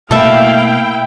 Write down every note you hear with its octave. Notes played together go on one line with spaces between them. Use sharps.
B2 A3 A#3 E4 A4 E5 F5 G5